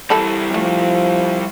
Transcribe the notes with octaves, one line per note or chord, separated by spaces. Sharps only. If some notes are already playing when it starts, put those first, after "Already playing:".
E3 G3 E4 A4 B5
F3 A3 C#4